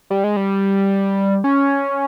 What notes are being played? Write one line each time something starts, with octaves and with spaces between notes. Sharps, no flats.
G3
G#3
G3
C#4